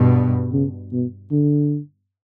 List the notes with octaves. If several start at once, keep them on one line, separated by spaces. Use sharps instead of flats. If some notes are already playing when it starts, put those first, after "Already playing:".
Already playing: G2 B2
C#3
B2
D3